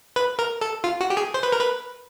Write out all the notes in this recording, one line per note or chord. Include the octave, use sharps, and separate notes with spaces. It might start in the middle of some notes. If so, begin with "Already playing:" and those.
B4
A#4
A4
F4
F#4
G4
G#4
C5
B4
A#4
B4